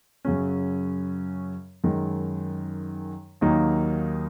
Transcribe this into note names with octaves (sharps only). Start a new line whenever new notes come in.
F#2 C#3 F#3 C#4
F#2 D#3 G#3
D#2 D#3 F#3 A#3 D#4